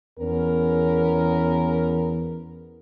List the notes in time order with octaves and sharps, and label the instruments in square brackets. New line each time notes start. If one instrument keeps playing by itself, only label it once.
[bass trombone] E2 [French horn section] B3 C#4 A#4